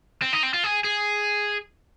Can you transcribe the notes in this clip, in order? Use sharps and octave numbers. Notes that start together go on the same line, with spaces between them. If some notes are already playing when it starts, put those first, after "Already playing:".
C4
D#4
C4
F4
G#4
G#4